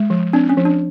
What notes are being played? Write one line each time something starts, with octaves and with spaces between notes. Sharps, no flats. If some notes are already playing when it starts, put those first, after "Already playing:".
Already playing: G#3
F3
C4 D4
C#4
F3
D4